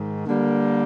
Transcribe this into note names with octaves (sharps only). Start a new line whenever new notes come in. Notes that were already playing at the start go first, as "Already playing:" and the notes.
Already playing: G#2 D#3
D3 G3 A#3